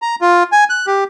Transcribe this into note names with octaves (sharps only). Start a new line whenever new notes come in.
A#5
F4
G#5
F#6
G4